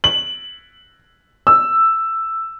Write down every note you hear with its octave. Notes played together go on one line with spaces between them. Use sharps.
F#7
E6